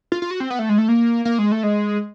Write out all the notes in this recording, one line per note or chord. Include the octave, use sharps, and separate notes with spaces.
F4
F4
F#4
C4
B3
A3
G#3
A3
A#3
A#3
G#3
A3
G#3